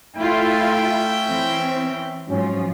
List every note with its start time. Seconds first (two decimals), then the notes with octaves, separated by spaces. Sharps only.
0.17 A3 C#4 E4 F4 E5 G5
1.27 E3 C4
2.29 G#2 F3 F#3 C#4